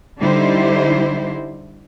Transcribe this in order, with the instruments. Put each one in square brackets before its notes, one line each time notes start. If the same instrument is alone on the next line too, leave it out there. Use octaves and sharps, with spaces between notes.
[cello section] D3 G3 D#4 E4 G4 C5